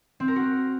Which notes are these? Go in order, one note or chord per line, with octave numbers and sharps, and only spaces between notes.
C4
A#4
F#4